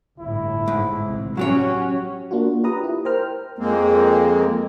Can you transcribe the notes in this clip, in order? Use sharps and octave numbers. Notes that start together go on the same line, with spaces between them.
G1 A2 E4
G#2
A1 C3
F#3 C#4 F#4 G4 C#5
A#3 D4 F4 F#4
F4 G4 B4 A#5 D#6
E4
A#4 C5 G5 A#5 F6
F2 G#3 A#3 C4